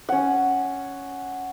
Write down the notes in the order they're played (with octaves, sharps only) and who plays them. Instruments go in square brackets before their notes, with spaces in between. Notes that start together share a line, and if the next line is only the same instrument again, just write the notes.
[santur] C#4 F#5